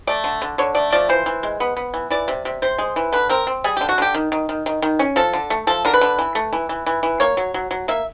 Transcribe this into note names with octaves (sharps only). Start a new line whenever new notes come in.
A3 D5
D3
D3
D3 C#5
A3 D5
F3 D5
E3 C5
E3
G#3
B3
B3
E3
E3 D5
C3
C3
C3 C5
G#3
E3
D3 B4
C4 A#4
C4
G3 G#4
D3 G4
F#4
D3 G4
D#3
D#3
D#3
D#3
D#3
C#4
F3 A4
D3
A3
F3 A4
D3 A#4
B4
D3
E3
A3
E3
E3
E3
E3
A#3 C#5
F#3
F#3
F#3
A#3 E5